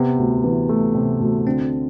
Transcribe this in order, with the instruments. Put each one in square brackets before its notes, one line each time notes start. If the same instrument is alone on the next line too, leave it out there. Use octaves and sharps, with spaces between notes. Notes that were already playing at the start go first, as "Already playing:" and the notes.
Already playing: [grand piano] C3 [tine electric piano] B3
[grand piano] D2
E3
A3
C3
D2
[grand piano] D3 [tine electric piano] C4